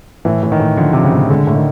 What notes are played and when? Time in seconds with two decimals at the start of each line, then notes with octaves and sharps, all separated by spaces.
0.25 A2 E3
0.43 A2
0.52 D#3
0.60 A2
0.77 D3 F3
0.93 C3 F3
1.04 C#3
1.12 A2
1.30 D3 G#3
1.47 A2
1.55 D#3